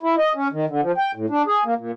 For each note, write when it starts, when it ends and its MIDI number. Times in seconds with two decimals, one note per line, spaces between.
0.03 0.15 64
0.18 0.33 75
0.35 0.48 61
0.52 0.66 51
0.69 0.81 50
0.82 0.92 53
0.98 1.11 79
1.15 1.26 45
1.30 1.42 62
1.46 1.64 68
1.65 1.74 58
1.77 1.91 46